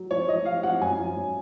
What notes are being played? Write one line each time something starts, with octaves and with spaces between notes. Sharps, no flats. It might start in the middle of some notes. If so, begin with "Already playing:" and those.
Already playing: F#3
F3 C#5
F3 D#5
F3 F5
F3 F#5
F#2 G#5
F3
F#2